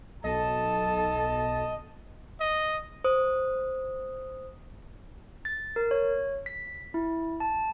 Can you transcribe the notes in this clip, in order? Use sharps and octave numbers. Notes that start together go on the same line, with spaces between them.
B1 A4 D#5 A5
D#5
C5 D#6
A6
A#4
C#5
B6
E4
A5